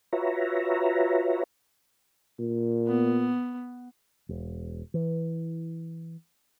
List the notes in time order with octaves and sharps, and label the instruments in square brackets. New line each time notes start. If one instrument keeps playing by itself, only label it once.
[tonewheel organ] F4 F#4 B4 C#5 E5 A#5
[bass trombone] A#2
[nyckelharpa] B3
[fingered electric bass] E1
E3